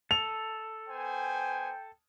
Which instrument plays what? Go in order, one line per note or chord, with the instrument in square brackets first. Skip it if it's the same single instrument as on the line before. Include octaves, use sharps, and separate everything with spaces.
[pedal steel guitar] A4 [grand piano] F7
[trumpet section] B3 C5 G#5 [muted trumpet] G5